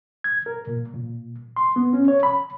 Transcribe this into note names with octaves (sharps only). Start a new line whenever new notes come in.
G#6
A#4
A#2
A#2
C6
B3
C#4
C#5
B5